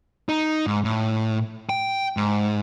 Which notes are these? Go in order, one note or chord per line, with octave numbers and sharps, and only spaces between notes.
D#4
G#2
A2
G5
G#2